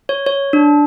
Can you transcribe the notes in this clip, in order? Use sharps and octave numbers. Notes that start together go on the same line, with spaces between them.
C#5
C#5
D4